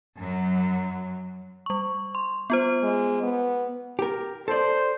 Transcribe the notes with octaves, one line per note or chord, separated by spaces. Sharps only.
F#2 F#3
G3 C#6
C6
B3 F4 C5
G#3
B3
G4 A#4
A4 C5 D5